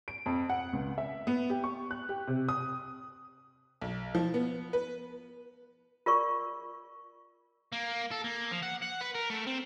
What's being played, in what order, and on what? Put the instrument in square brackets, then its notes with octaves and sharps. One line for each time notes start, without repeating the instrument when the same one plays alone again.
[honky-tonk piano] D7
F2
F#5
C#2
E5
B3
G4
C#6
F#6
G4
C3
D#6
B1
F3
B3
B4
[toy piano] F4 A#4 D5 C#6
[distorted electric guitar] A#3
A4
A#3
F3
F#5
F#5
B4
A#4
A3
C4